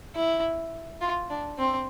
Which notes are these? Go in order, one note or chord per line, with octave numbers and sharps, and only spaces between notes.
E4
F4
D4
C4